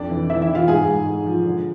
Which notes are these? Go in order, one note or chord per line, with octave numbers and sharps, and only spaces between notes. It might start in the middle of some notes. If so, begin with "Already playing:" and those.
Already playing: F2 D4 D5
E3
E3 E4 E5
E4 E5
E3
F4 F5
G#2 G#4 G#5
G#2
G#2
F3
D3